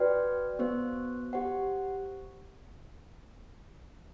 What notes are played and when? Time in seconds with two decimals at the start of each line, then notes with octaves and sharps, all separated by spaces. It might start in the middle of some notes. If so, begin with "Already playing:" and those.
Already playing: F#4 B4 D5 G5
0.59 B3 F#4 C5
1.33 G4 C5 F#5